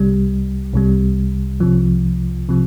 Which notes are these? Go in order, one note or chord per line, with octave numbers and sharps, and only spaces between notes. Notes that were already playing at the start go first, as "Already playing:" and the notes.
Already playing: C2 C3 G3
C2 C3 G3
C2 C3 F3
C3 F3